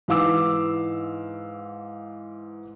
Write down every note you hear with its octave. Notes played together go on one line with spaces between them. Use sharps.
G#2 E3 F5 D6 E6